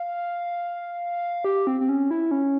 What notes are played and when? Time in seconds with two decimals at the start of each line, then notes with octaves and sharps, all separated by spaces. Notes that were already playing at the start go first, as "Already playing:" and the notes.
Already playing: F5
1.44 G4
1.67 C4
1.80 C4
1.89 C#4
2.11 E4
2.31 C#4